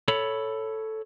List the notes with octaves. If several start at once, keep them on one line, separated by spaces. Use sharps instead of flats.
A4 C#5 B5